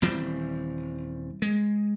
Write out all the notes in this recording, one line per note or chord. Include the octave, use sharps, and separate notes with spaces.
D#1 E3 G3 C4
G#3